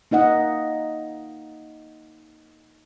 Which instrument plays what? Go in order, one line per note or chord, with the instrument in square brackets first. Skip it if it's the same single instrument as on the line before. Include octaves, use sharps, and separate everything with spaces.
[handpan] A#3 D#4 D#5 F#5